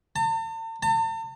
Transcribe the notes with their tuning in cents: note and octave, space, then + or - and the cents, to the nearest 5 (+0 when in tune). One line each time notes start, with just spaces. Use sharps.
A5 +45
A5 +45